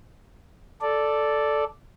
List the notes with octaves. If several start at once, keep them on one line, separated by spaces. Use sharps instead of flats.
A4 D5